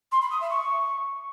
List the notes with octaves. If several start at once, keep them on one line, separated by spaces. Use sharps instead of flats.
C6
B5
D#6
E5
C#6